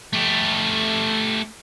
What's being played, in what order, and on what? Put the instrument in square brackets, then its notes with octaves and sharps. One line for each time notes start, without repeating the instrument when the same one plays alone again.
[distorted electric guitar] A3 G4